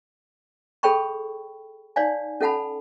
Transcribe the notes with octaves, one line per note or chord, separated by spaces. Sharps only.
G#4 A4 C#5 G5 B5 C#6
D#4 C#5 D5 F5 G#5
C#4 A4 F#5 A5 B5